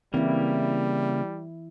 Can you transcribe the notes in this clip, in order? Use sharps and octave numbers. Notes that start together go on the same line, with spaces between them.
C#3 E3 G3 A#3 C4 E4